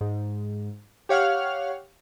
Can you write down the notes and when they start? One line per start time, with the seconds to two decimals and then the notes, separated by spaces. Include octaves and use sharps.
0.01 G#2
1.09 G4 C#5 F5 F#5 F6